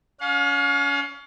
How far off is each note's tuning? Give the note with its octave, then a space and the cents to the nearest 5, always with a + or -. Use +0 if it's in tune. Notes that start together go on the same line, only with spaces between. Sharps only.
C#4 +30 F5 +35